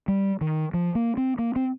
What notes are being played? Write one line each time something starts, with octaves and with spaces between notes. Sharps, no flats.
G3
D#3
F3
A#3
C4
A#3
C4